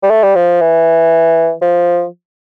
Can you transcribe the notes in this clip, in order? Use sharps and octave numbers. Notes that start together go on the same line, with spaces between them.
G3
A3
G3
F3
E3
F3